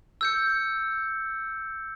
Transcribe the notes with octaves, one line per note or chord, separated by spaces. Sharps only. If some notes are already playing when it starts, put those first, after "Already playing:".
E6 G6 C#7